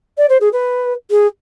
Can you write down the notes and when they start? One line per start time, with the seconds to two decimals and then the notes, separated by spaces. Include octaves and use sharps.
0.17 D5
0.29 C5
0.40 G#4
0.52 B4
1.10 G#4